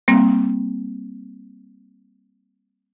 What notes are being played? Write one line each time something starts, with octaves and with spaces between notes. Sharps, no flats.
G3 A#3 C4